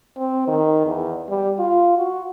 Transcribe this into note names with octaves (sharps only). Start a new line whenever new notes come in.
C4
D#3
E2
G3
F4
F#4